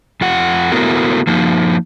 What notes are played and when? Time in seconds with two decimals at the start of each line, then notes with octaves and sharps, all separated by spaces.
0.21 F2 F4 F#5
0.72 A3 B3 E4 F#4 A#4
1.27 F3 A#3 D#4